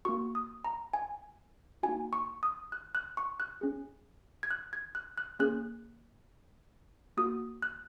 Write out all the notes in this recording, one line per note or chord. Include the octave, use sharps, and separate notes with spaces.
A#3 F#4 C#6
D#6
A#5
G#5
A#3 D#4 F#4 G#5
C#6
D#6
F#6
F#6
C#6
F#6
C#4 G#4
G#6
F#6
G#6
F#6
F#6
A#3 C#4 G#4 F#6
A#3 F#4 D#6
F#6